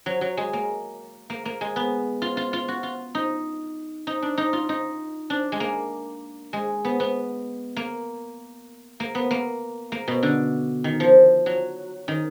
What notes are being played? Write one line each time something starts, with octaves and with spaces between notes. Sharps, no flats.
F#3
F#3
G#3
A#3
A#3
A#3
G#3
B3
F4
F4
F4
F#4
F4
D#4
D#4
D4
D#4
F4
D#4
D4
G#3
A#3
G#3
B3
B3
A#3
A#3
B3
A#3
A#3
B2
D3
D#3
F3
F#3
D#3